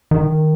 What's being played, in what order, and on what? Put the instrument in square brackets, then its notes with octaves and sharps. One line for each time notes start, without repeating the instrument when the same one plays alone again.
[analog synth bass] D#3